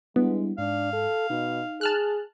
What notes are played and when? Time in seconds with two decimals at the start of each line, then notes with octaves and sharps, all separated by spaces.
0.16 G3 G#3 B3 D4 E4
0.58 G#2 D4 F5
0.93 A4
1.30 B2 D#4
1.81 G#4 A5 F6 F#6